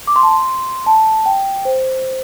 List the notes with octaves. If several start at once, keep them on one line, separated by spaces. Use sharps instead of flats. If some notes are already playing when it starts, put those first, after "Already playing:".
D6
C6
A5
C6
A5
G5
C5